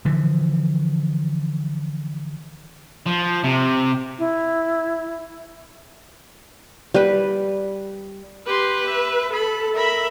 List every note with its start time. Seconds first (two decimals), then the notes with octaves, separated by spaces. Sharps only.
0.05 D3 E3 F3
3.06 F3
3.44 C3
4.19 E4
6.94 G3 B4
8.47 G4 B4 C6
8.86 E5
9.33 A4 B5
9.75 A#4 E5 B5